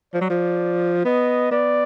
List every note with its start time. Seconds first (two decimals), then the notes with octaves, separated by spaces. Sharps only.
0.14 F3 D5
0.21 F#3
0.30 F3
1.05 B3 D#5
1.51 B3 D5